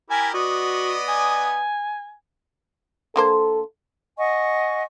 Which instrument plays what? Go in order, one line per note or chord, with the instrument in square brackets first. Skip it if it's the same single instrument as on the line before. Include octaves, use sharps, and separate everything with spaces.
[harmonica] E4 G4 A#4 [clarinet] G#5
[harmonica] B3 D5 D#5 [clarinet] F#4
[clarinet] G#5
[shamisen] D3 A#3 C5 [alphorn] A4
[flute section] D#5 F#5 G#5 C#6